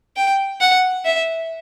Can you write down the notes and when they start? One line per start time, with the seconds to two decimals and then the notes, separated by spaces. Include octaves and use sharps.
0.16 G5
0.61 F#5
1.05 E5